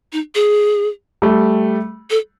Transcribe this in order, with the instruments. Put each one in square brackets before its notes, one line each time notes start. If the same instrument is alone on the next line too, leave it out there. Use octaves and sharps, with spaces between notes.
[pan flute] D#4
G#4
[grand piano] G3 A3
[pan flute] A4